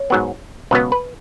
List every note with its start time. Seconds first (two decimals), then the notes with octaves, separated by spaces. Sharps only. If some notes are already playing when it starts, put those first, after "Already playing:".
Already playing: C#5
0.10 G#2 F#3 B3
0.71 C#2 B2 F#3 B3 B4
0.92 B4